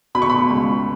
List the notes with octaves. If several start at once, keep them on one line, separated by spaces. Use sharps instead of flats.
B2 B5
C#6
B5
C#2